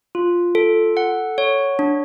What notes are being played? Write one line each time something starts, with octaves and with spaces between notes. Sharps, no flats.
F4
A4
F#5
C#5
D4